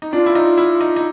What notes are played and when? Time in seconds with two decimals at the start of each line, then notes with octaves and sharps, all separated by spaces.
0.02 D#4
0.12 D4 F4
0.26 E4
0.35 D#4
0.58 E4
0.81 D#4
0.96 D#4